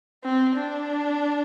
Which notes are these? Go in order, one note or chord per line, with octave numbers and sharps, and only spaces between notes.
C4
D4